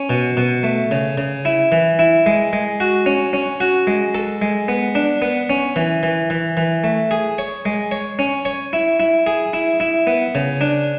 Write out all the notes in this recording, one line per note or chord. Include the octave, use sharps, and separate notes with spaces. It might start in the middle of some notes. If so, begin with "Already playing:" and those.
Already playing: C#4
B2
B2
A3
C#3
C#3
E4
E3
E4
G#3
G#3
F#4
C#4
C#4
F#4
G#3
A4
G#3
B3
D4
B3
C#4
E3
E3
E3
E3
A3
G#4
C#5
G#3
C#5
C#4
C#5
E4
E4
G#4
E4
E4
B3
C#3
D4